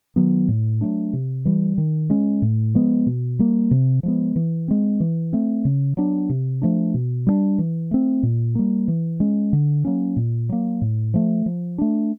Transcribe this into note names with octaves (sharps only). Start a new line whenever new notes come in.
D#3 F#3 B3
A2
F#3 A3 D4
C3
E3 G3
D#3
G#3 C#4
A2
F3 G#3 B3
B2
G3 A#3
C3
F3 G#3 B3
E3
G#3 C4
E3
A3 C4
C#3
F#3 B3 D4
C3
F3 A3 D4
B2
G3 A#3 D4
E3
A3 C4
A#2
G3 A#3
E3
G#3 C#4
D3
F#3 A#3 C#4
A#2
F#3 A#3
A2
F3 A3
F3
A3 D4